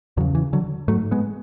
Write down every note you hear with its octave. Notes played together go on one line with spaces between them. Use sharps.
E2 C#3 D3 F#3
E3
D3 F#3
G#2 F#3 A3
G#3 B3